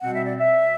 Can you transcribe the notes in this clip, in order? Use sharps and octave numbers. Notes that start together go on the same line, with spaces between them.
B2 G3 C4 F#5
E5
D5
E5